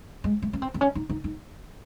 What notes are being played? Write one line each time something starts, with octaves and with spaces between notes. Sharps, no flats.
G#3
A3
C#4
C4
C4
C#4
D#4
D#4
D#4